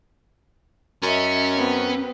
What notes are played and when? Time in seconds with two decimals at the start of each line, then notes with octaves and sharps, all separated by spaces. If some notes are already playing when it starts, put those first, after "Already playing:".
1.03 F#2 C#4 D#5 E5
1.55 B3 C4 B4